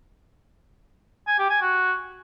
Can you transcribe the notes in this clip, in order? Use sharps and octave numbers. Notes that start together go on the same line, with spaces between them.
G#5
G4
G#5
F#4